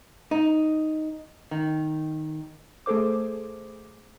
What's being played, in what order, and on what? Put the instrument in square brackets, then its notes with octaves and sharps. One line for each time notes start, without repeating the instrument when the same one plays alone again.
[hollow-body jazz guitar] D#4
D#3
[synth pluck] A3 G#4 A4 C5 D6